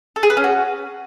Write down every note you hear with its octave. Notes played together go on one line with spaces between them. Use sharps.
A4
G#4
B4
C#4
F#4